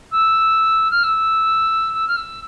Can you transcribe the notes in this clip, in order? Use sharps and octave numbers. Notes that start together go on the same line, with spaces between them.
E6
F6
E6
E6
F6
E6